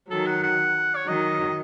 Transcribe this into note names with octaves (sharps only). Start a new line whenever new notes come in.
D#3 F#3 A4
F#5
F#5
C#5
D#3 F#3 D#5